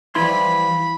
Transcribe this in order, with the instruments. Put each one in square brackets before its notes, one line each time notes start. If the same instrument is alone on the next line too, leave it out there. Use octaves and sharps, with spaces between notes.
[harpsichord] E3 F3 G3 [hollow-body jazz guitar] E4 C6 [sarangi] B5